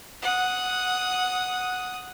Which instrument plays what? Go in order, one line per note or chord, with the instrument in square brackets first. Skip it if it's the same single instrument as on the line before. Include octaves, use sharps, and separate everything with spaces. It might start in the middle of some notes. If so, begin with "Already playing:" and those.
[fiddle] F#5 D#6